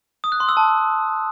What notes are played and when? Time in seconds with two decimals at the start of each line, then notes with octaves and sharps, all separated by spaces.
0.24 D#6
0.32 F#6
0.40 C6
0.49 E6
0.57 A5